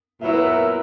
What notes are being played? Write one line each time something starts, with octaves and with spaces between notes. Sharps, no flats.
A#2 F#3 B3 E4 E5
B4
A#4